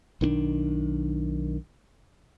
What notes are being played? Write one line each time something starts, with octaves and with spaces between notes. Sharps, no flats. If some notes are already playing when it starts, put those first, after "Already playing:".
B1 D#3 C#4 D4